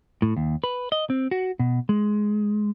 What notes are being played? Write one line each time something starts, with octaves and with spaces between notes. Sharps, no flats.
A2
D#2
B4
D#5
C4
F#4
B2
G#3